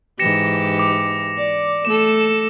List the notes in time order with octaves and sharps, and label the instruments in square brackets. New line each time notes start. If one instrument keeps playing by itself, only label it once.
[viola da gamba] G#2 E3 G4 [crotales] A#6 C#7 E7
[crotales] D6
[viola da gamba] D5
[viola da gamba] A3 A4 [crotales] E7